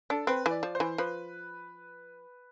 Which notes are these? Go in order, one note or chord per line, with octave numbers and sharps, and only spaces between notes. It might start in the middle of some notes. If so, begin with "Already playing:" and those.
D4 A4
C4 B4
E3 D5
F3
C5
E3
F3 B4